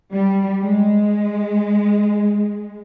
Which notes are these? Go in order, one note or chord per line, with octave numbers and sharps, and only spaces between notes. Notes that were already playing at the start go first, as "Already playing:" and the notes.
G3
G#3